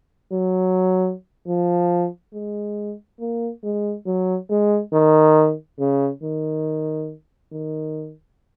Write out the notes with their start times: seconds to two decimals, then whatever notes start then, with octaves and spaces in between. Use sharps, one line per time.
0.32 F#3
1.47 F3
2.34 G#3
3.20 A#3
3.64 G#3
4.06 F#3
4.50 G#3
4.93 D#3
5.79 C#3
6.23 D#3
7.52 D#3